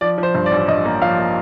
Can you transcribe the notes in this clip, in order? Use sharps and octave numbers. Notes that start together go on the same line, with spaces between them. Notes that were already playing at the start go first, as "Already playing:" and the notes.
F3 D5
F3
C5
G2
D5
A1
G2 D#5
A#3
F3 F5
A#3